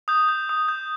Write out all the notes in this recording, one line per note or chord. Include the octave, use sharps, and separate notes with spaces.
D#6 G6
G6
D#6
G6